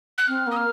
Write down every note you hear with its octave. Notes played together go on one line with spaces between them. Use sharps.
F#6
C4 F6
A#3 D#6
F6